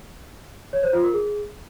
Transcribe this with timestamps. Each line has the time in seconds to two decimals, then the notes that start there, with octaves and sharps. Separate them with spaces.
0.73 C#5
0.83 C5
0.93 F4
1.03 A#4
1.13 G#4